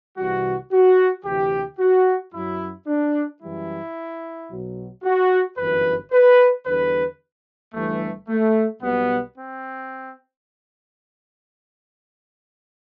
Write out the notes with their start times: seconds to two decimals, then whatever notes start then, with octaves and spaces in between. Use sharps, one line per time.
0.18 C2 C3 E3 G3 F#4
0.72 F#4
1.25 D2 C3 E3 G4
1.79 F#4
2.34 F#2 F#3 E4
2.87 D4
3.42 F#2 E3 G3 E4
4.50 B1 B2 F#3
5.04 F#4
5.57 G1 F#2 E3 B4
6.12 B4
6.66 E2 D3 G3 B4
7.74 G1 G2 E3 G3 A3
8.29 A3
8.82 B1 B2 G3 B3
9.37 C4